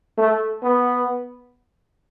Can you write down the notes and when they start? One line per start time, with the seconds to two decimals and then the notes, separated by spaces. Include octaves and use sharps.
0.18 A3
0.63 B3